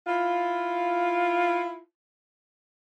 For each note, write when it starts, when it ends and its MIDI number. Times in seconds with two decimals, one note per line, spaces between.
0.07 1.79 64
0.07 1.79 65